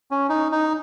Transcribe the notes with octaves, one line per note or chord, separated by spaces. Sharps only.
C#4
D#4
D#4